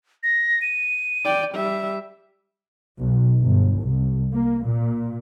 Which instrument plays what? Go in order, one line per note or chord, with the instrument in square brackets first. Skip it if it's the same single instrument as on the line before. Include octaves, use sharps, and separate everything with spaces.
[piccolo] A#6
D#7
[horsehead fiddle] D5 G5
G3 E5
[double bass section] B1
G1
C2
A#3
A#2